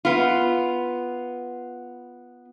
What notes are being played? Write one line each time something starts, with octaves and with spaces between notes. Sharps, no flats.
B3 F4